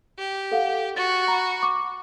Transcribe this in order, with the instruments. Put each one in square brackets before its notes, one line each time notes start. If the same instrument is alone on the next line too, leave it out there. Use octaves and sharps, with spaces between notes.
[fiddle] G4
[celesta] A4 F5 F#5
[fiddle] F#4 [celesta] A6
[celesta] A#5 B5
C#6 D6